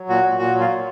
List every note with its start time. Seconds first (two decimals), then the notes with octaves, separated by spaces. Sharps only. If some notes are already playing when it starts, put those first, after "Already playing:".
Already playing: F#3
0.09 A#2 F#4
0.24 A#2
0.39 A#2 F#4
0.55 F#3
0.60 F4
0.69 A#2